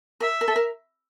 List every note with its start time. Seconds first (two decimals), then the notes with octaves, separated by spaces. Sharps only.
0.20 A#4 E5
0.41 A#4
0.48 A4
0.56 A#4